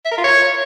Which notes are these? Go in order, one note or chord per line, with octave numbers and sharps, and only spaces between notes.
E5
A#4
F4
C#5